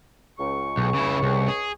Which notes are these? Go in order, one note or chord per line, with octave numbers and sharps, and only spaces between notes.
C#2 C#6
B1
C#3 E4
C2
G#4